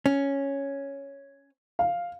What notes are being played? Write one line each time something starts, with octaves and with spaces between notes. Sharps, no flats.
C#4
F5